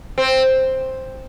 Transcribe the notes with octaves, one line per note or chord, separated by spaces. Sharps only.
C4